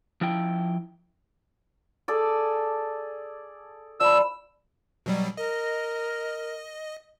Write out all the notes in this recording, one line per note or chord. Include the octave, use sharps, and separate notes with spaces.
F3 E4 G5
G#4 A4 D5
F3 D5 B5 E6
B2 F#3 G3
A#4 D#5